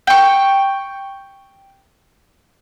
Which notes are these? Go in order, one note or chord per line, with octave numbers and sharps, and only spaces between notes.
G5 C#6